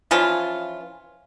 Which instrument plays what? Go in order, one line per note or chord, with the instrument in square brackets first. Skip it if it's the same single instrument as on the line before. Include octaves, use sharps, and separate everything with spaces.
[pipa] E3 F3 C#4 F4